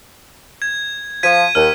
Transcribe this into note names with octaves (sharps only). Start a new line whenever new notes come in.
G#6
F3 G#6 B6 D#7
D#2 F6